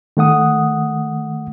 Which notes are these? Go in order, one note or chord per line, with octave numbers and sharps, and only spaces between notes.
D#3 A3 F#5 D#6